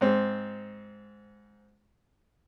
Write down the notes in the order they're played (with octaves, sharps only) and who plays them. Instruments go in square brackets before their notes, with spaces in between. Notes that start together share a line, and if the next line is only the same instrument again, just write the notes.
[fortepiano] G#2 C4